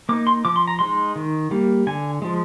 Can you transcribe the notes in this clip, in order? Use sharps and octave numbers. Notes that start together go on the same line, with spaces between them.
A#3 D#4 D6
C6
F3 D6
C6
A#5
G#3 D#4 C6
D#3
G3 A#3
D3 G#5
F3 G#3